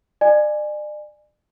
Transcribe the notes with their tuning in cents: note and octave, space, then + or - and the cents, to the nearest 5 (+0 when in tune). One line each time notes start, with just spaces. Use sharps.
D5 +40 G#5 +0